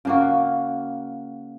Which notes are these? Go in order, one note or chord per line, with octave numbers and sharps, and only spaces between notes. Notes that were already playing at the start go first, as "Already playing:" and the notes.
C#3 A#3 F#4